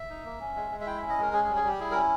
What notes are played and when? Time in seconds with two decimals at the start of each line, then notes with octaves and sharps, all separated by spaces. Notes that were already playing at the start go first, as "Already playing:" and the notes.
Already playing: E5
0.10 D#4
0.25 A#3
0.41 C#4
0.56 G#3
0.72 G#3
0.81 E5
0.87 E4 G5
0.98 C#4 E5
1.10 D#5
1.18 G#3 A#4
1.33 C#4 G#4
1.44 G#4
1.48 G3
1.56 G#4
1.64 G3 G4
1.80 E4 G#4
1.91 A#4
1.95 C#4